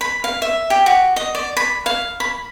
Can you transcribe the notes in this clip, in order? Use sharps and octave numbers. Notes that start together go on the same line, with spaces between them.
B5
F5
E5
G4
F#4
D#5
D5
B5
F5
B5